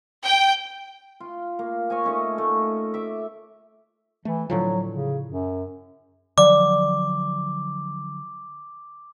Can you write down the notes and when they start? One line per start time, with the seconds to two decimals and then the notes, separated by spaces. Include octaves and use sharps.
0.25 G5
1.20 F4
1.59 A#3
1.90 C#5 D#5 G#5
2.04 A3 C#4 D#4
2.38 A3
2.94 E5 D6
4.25 E3 A3
4.50 A2 D3 F3 F#3
4.90 C#3
5.28 F#2
6.38 D3 F3 F#3 D5 D6